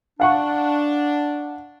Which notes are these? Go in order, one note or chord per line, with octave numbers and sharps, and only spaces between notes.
D4 F5 F#5 C#6